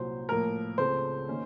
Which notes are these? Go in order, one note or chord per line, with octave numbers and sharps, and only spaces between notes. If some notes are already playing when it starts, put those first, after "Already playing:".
Already playing: C2 A#2 F#3 C5
A2 F3 A#3 A#4
C#2 C#3 A3 C4 C5
D#3 A#3 C#4